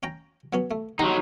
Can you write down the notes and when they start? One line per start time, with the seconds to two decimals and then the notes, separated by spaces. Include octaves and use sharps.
0.03 C#4 G5 A#5
0.53 F#3 B3 C#4
0.71 A3
0.99 F#3 D#4 G4 F#5 A#5